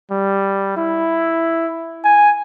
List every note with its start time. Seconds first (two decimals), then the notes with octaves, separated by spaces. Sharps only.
0.11 G3
0.77 E4
2.05 G#5